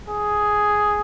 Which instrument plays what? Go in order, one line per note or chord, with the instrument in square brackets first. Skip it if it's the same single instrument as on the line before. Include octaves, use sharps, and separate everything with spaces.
[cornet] G#4